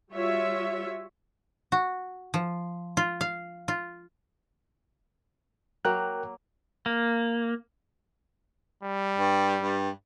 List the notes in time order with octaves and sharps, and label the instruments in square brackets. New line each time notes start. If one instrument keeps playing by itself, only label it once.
[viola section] G3 F4 F#4 C#5 E5
[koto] F#4
F3
F4
F5
F4
[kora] F#3 A#3 [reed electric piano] A#4 G5 F#6
[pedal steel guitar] A#3
[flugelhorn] G3
[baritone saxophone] G2
G2